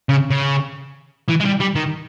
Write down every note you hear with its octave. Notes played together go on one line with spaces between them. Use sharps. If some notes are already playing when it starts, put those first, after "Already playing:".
C#3
C#3
E3
G#3
G3
G3
D#3